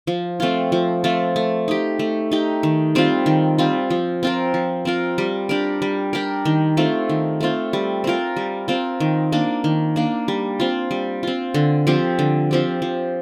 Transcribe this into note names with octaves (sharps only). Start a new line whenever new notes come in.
F3
A3 C4 F4
F3
A3 C4 F4
A3
D#4 G4
A3
D#4 G4
D#3
G3 C4 F4
D#3
G3 C4 F4
F3
C4 F4 A#4
F3
C4 F4 A#4
G3
D4 G4 A#4
G3
D4 G4 A#4
D#3
A3 C4 F4
D#3
A3 C4 F4
G3
C4 F4 A#4
G3
C4 F4 A#4
D#3
A#3 D4
D#3
A#3 D4
G3
C4 F4
G3
C4 F4
D3
F3 C4 G4
D3
F3 C4 G4
F3